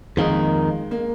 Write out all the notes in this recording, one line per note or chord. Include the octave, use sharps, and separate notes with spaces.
F2 D#3 G#3 A#3 D#4
A#3